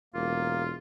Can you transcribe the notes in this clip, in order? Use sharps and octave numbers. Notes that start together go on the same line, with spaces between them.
E1 A#3 F4